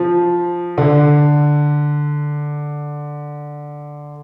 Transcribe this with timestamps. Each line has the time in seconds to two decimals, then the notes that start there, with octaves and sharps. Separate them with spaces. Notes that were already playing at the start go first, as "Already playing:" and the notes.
Already playing: F3
0.78 D3